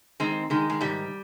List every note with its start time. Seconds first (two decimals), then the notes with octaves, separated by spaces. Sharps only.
0.20 D#3 G#3 C4
0.50 D#3 G#3
0.70 G#3
0.81 G#2 G3